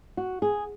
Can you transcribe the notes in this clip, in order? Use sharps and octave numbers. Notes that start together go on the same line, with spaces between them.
F#4
G#4